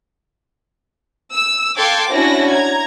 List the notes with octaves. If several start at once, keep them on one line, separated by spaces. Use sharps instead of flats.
E6
A4 F5 G5 C6 D6 G#6
C#4 D4 E4 F#4 A#6
A#5 G#6